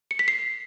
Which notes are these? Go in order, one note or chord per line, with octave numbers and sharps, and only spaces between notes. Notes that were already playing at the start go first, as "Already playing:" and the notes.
C#7
B6
C7